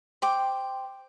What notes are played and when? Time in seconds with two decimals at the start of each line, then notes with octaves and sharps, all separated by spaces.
0.22 C5 G5 D6